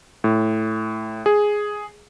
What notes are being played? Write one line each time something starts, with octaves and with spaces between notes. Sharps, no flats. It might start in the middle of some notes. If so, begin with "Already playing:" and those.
A2
G#4